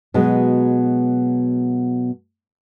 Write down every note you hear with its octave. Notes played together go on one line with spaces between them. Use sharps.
B2 F#3 G#3 B3